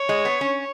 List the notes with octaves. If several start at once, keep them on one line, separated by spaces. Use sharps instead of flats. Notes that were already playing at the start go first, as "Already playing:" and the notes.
Already playing: C#5
G#3
B3
C#4